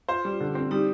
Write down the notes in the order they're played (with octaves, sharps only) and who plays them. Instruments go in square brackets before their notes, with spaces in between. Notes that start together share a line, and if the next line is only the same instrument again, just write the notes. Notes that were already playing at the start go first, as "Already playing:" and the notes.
[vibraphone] F4 [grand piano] C5
[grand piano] G3
D3
C4
[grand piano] G3 [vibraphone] D#4 G4